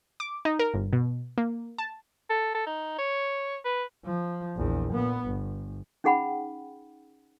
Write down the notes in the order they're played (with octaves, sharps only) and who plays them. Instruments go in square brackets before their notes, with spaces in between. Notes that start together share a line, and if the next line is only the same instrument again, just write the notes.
[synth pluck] D6
D#4
A#4
G1
B2
A#3
A5
[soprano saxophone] A4
A4
D#4
C#5
B4
[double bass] F3
A#1 E2
A#2 B3
G1
[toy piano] C#4 D#4 G#4 F#5 G5 B5